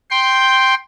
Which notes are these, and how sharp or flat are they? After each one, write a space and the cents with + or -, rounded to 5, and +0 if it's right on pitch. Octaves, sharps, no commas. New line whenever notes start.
G5 +0 C6 +5